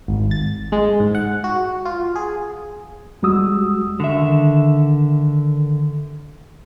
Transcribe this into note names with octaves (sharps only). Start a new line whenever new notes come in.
G#1
A6
G#3
G#2
F#5
F#4
F4
G#4
E2 G3 G#3 F#4 D#6 E6
D3 D#3 E5